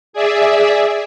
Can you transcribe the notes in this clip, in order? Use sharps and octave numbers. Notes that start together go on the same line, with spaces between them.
G#4 D5 E5